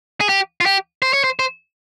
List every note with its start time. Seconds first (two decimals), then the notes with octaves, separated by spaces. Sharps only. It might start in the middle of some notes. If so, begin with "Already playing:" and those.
0.21 G#4
0.29 G4
0.61 F4
0.66 G4
1.02 C5
1.13 C#5
1.24 C5
1.39 C5